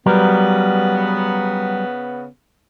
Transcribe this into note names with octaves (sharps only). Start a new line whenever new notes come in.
C#3 F#3 G3 B3 A#4